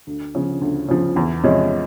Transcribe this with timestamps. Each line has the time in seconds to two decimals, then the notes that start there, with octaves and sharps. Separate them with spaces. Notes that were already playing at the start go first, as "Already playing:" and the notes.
0.07 D2
0.35 C#3 F3
0.61 D2
0.89 C#3 F3
1.16 E2
1.44 C3 F3 G#3 C#4